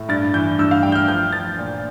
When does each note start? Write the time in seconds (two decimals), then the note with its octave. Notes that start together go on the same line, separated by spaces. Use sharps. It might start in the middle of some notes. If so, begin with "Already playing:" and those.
Already playing: A2
0.09 G2 A6
0.34 E3 G6
0.59 G2 E6
0.71 F5
0.83 G3 G5
0.92 G6
0.95 F6
1.08 F3 G6
1.33 F3 A6
1.58 A#2